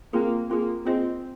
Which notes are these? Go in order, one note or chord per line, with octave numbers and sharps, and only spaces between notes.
A#3 C4 F4 G#4
A#3 C4 F4 G#4
C4 F4 G#4 C5 D#5